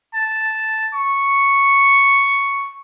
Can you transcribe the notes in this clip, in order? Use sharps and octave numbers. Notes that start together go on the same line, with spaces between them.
A5
C#6